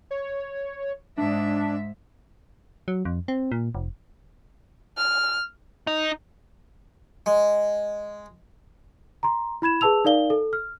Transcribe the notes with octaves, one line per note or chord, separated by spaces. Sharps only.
C#5
G#2 D4 E5
F#3
F2
C4
A#2
F1
F6
D#4
G#3
A#5 C6
E4 B5 G#6 E7
G#4 B4 A5 E6 F7
D#4 A#4 D5 F5 G7
A4
F6